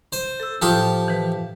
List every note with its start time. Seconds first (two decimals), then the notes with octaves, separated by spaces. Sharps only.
0.13 C5
0.40 A4 E6
0.62 A2 F3 F4 G4 A4 D#6
1.08 E3 B4